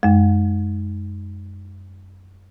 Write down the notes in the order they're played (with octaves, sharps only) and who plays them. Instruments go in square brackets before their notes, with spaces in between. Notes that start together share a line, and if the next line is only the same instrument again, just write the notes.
[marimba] F#2 G#3